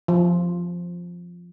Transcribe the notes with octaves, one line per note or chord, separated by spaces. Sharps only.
F3